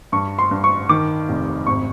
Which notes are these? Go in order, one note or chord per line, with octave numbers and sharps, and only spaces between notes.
G2 C#6
C6
G2
C#6
D#3 D6
F1
G#1 C#6